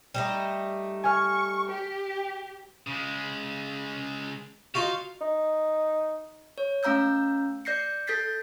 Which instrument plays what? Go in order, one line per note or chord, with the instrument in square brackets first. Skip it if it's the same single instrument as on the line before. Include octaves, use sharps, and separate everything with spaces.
[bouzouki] G3 A3 D#4 [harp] E7
[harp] G#5 F6 [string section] C#6
[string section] G4
[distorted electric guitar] C#3 G#3
[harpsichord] D#4 F4 F#4 [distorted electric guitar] F5
[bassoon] D#4
[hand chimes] C#5
A3 C#4 F5 A#5 E6 G6
D5 G6 A#6 C7 C#7
A4 G6 A6 B6 C7